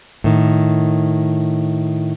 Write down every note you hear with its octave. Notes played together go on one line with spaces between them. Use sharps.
A2 D#3